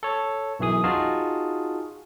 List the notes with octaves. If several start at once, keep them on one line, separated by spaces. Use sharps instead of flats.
A4 C#5
B1 F#2 E3 G#4 D#6
D#4 F4 F#4 G#4 F5 A5